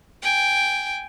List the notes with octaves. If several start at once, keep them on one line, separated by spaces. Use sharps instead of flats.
G5 G#5